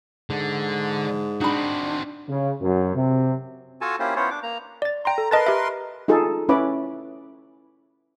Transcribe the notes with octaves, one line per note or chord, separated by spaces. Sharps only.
G#2 D3
C4 D4 D#4 F#4 B5
C#3
F#2
C3
F4 F#4 A4 G#5 A5
A#3 C#4 E4 F4 G4 C5
B3 C#4 E4 F4 C5 C#5
D4 D6
A#3 A#5
D5 A6
G5 A#5 C6
A4
A#4 B4 D#5 A5 C6 A6
G4 E5
D#4 F4 G#4 A4 A5
C#4 E4 B4 C#5 B5 D6